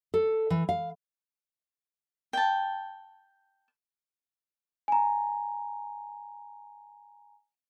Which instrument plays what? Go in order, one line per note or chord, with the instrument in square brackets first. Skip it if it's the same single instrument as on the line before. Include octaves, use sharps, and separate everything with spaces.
[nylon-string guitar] A4
E3
F5
[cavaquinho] G5 A5
[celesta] G#5 A#5